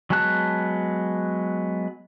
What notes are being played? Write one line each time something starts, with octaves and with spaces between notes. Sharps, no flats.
F#3 G#3 B3 A5 F#6